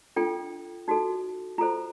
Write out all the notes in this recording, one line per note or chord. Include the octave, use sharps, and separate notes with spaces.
D4 F4 A4 G5
D#4 F#4 A4
F4 A4 C5 A#5